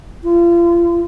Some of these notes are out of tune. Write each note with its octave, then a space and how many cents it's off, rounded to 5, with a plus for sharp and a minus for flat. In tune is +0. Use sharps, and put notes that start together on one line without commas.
F4 -35